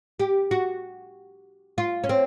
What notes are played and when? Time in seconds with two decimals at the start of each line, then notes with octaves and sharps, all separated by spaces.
0.20 G4
0.51 F#4
1.78 F4
2.04 C#4
2.09 C4